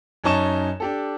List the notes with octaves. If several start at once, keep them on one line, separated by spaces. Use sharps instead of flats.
F#2 C#4 D#4 A5 C#6 E7
D4 G4 A4